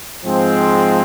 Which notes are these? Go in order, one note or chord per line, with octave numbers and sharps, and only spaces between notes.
G#2 F3 G#3 C4